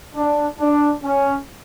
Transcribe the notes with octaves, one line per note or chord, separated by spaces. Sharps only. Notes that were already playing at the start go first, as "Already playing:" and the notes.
D4
D4
C#4